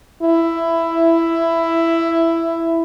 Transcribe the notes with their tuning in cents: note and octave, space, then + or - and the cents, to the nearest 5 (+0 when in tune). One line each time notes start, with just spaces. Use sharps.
E4 +10